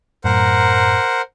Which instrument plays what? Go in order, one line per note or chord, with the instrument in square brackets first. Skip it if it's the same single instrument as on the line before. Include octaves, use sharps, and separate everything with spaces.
[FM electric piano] F#2 A2 A#5 [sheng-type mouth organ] A#4 C5 F#5